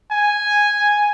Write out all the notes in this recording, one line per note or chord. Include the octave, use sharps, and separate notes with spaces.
G#5